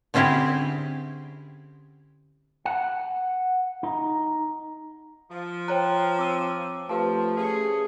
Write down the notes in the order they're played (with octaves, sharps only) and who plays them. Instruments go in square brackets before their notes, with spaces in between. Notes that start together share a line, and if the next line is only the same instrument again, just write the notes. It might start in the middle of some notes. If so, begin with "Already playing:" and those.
[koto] D3 C4 C#4 E4 G4 G#4
[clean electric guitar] F#5
D#4
[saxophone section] F3
[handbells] C5 C#5 A#5 [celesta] G5 F#6
[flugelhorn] C4 [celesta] D6 E6 D#7
[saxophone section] F3 [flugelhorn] A3 [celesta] G4 B4 A5
[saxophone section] C#4 G#4